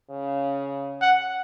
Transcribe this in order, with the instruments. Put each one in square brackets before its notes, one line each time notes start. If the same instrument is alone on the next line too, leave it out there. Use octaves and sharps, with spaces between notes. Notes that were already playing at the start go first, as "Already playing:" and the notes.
[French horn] C#3
[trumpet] F#5